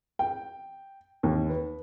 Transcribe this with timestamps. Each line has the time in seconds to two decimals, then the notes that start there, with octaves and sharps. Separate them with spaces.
0.19 G5
1.23 D#2
1.49 B4